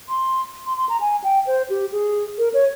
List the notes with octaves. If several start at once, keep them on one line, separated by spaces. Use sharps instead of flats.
C6
C6
C6
A#5
G#5
G5
C5
G4
G#4
A#4
C#5